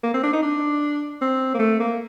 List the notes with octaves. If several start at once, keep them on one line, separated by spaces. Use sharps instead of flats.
A#3
C4
D4
D#4
D4
C4
A#3
A3
A#3